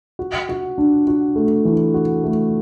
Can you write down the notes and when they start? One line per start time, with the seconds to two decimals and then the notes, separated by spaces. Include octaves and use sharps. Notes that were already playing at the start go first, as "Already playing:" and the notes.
0.19 F#4
0.49 F#4
0.78 D4
1.07 F#4
1.36 A3
1.65 E3
1.94 F#4
2.24 A3